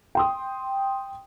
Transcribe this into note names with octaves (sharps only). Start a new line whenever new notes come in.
G5 C6 D#6